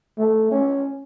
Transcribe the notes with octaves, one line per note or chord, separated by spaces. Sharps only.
A3
C#4